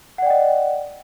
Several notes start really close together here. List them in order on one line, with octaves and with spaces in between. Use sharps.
F#5 D5 G5 D#5